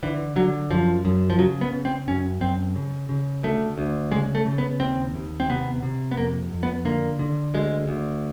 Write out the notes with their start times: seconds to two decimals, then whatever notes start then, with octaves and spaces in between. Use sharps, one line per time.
0.03 D3 E3
0.36 D3 F#3
0.70 F#2 F3
1.05 F#2
1.30 F3
1.38 C#3 F#3
1.61 B3
1.73 C#3
1.85 C4
2.08 F#2 C#4
2.41 F#2 C4
2.76 C#3
3.09 C#3
3.43 D2 A3
3.78 D2
4.12 C#3 G#3
4.35 A3
4.46 C#3
4.58 B3
4.80 D#2 C4
5.14 D#2
5.40 C4
5.49 C3 B3
5.83 C3
6.11 B3
6.16 F2 A#3
6.51 F2
6.63 B3
6.85 D3 A#3
7.19 D3
7.54 D2 G#3
7.88 D2